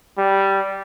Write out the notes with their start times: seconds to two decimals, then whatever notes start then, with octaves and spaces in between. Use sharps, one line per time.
0.18 G3